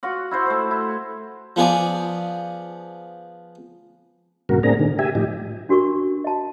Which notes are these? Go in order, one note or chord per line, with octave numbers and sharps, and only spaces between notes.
F4 F#4 F#5
E4 F#4 C5 C6
A3 C5
E4
F3 B3 G#4 D5
G2 A#2 C#3 F#4 A#4
A2 A#3 C4 D4 G#4 A#5
A#2 D3 D#3
G4 E5 G#5
A2 F3 D#4 G4
D4 F#4 A#4 C#6
D#5 A5